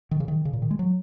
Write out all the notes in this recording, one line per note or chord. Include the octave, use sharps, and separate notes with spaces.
D#3
C#3
D#3
C#3
A#2
D#3
G#3
F#3